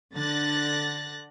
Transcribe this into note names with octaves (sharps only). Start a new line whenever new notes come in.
D3 F#6 A6 A#6